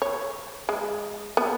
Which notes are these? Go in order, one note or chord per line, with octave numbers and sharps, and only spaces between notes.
C#5
G#3
B3